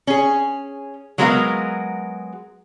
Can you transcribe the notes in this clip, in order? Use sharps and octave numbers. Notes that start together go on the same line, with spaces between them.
C#4 G#4
F#3 G#3 B3 F#4 A#4 F5